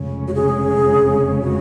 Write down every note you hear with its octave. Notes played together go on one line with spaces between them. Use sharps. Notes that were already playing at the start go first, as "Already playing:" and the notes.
Already playing: F1 F2 C#3 G#3 C#4
F#4
G#4
F#4